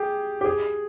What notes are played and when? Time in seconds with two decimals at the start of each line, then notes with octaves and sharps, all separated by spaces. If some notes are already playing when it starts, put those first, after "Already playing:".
Already playing: G4 G#4
0.41 G4
0.45 G#4